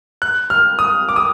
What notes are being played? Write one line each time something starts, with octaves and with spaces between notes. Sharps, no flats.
F#6
F6
D#6
D6
D#6